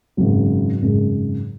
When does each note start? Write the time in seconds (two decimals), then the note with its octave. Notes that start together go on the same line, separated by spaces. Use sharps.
0.17 G#1 F#2 C#3 F#3
0.82 G#1 F#2 C#3 G#3